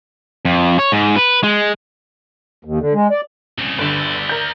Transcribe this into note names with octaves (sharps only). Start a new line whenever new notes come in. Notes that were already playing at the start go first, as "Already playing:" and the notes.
F2
C#5
G#2
B4
G#3
D#2
D3
G#3
D5
C2 C#3
G1 D3 D5 E5
A#4 G6